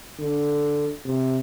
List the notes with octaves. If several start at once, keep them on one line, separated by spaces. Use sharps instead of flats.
D3
C3